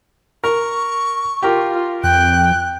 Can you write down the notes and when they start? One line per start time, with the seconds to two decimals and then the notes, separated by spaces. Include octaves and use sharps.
0.44 A#4 C#6
1.43 F4 G4 A#4
2.04 F2 G5 F#6